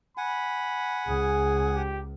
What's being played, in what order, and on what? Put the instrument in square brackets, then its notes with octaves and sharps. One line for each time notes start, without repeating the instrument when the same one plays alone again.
[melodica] F#5 G#5 [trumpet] B5
[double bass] C#2 [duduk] G#4
[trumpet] G4